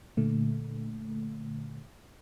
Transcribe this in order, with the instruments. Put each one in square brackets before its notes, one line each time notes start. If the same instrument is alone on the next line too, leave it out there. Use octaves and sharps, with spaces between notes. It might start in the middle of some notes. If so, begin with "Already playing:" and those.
[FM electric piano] A#2 D3 A3